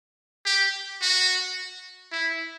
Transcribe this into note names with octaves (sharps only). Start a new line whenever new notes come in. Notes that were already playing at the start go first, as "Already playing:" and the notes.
G4
F#4
E4